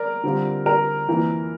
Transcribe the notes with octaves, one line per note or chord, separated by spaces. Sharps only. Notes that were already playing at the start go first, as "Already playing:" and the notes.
Already playing: A#4 D5
D3 G3 C4 F4
A#4
F2 E3 A#3